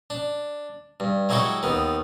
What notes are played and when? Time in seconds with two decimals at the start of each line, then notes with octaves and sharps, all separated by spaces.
0.10 D4
1.00 G2
1.29 F#3 G#3 E4 G4 A4 C#5
1.63 D#2 D#3 B3